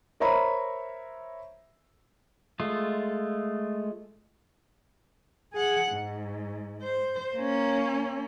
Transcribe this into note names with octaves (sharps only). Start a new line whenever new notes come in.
A#4 C5 C#5 E5 A#5 B5
G#3 A3 F4
G#4 F#5
G#2
C5
A#3 C#4